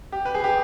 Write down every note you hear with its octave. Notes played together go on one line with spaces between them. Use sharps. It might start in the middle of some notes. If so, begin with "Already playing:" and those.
G4
B4
G#4
G4